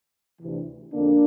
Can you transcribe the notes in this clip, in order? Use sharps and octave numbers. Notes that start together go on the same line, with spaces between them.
D2 C3 E3
F2 D3 A#3 D4